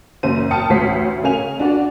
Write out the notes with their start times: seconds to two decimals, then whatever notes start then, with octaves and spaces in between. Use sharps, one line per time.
0.23 F#1 F#2 C5 D#7
0.51 G5 A5 D#6 F6 C#7
0.69 A1 D2 F#4 C5 B6 C7
1.22 C#3 C#4 A#4 F5 G#5 F7
1.59 D4 F#4 D5